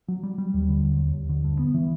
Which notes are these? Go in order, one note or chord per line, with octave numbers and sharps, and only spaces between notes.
F#3
G3
G3
D#2
D3
D#2
D#2
D#2
D3
G2
B3
E3